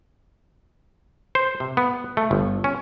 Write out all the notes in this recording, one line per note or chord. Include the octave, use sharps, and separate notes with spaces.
C5
C3
B3
A3
G1
C#4